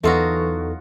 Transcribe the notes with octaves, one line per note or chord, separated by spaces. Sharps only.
E2 E3 F#3 D#4 F4 F#4 A4 E5